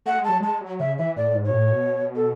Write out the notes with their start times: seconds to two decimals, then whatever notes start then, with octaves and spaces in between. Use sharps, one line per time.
0.06 A3 F#5
0.18 G#3
0.25 F#3 A5
0.40 G#3 A5
0.61 F#3
0.80 C#3 E5
0.98 E3 E5
1.16 A2 D5
1.35 G#2
1.45 B2 C#5
1.54 A2
1.72 B2
2.16 A4